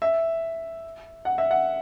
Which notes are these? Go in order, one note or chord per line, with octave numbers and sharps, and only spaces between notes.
E5
F#5
E5
F#5